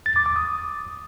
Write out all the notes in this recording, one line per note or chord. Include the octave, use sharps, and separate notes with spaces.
A6
D6
D6
D#6